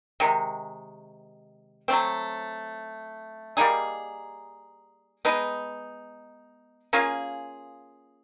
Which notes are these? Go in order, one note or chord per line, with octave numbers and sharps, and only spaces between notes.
C3 D#3 G#3
F#3 A3 C4
G3 A#3 D#4 G#4
G#3 B3 D#4
A#3 C#4 F4 G#4